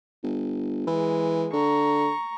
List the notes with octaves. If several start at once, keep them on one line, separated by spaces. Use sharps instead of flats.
G1
E3 G#3
D3 A#5 C#6